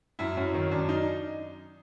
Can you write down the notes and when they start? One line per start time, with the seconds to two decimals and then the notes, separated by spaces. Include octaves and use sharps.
0.19 F#2 E4
0.37 F#2 C#4
0.54 D#3 C#4
0.71 F#2 D4
0.89 D#4